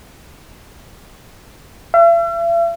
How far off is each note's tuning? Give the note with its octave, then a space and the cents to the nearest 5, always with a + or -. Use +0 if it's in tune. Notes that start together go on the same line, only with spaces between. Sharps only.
E5 +45